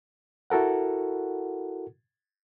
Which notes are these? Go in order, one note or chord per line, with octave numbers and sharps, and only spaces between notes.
E4 F#4 A4 A#4 F#5